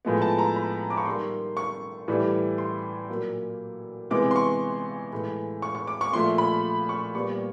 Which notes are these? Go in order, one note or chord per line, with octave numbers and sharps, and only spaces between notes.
A2 F3 G#3 B3
A5
A#5
B5
D6
C#6
D#3 G3 A#3 C6
C#6
A2 E3 G3
C6
A#2 F#3 A#3
C3 E3 G#3 B3 D6
C6
C#6
A2 E3 G#3
C#6
C#6
D6
C#6
A#2 F3 A3 C6
B5
C#6
A#2 G3 B3 C#6